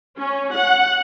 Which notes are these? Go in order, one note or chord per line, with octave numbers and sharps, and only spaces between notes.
C#4
F#5